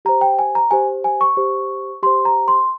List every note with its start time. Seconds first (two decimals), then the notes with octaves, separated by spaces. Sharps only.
0.05 G4 C5 A#5
0.21 G5
0.39 G#5
0.55 A#5
0.71 G4 C5 G#5
1.04 G#5
1.21 C#6
1.37 G4 C5
2.03 G4 C5 C6
2.25 A#5
2.48 C6